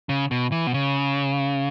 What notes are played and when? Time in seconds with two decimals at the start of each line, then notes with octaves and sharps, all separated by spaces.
0.09 C#3
0.31 B2
0.52 E3
0.67 B2
0.74 C#3